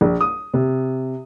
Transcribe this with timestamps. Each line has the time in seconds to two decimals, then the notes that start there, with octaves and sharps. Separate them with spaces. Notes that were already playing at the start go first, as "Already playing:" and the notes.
0.01 A#1
0.21 D#6
0.54 C3